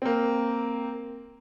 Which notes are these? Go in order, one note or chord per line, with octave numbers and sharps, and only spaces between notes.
A#3 C4